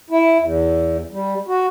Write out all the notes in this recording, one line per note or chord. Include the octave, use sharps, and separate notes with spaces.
E4
E2
G3
F#4